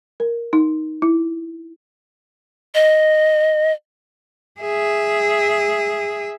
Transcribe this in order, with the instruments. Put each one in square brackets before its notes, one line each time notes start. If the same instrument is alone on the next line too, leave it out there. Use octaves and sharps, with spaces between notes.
[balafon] A#4
D#4
E4
[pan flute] D#5
[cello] G#4 E5